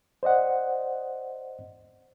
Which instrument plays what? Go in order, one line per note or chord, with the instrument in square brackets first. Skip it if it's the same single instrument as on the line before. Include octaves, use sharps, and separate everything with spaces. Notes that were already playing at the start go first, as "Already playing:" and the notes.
[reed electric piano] C5 D5 D#5 F#5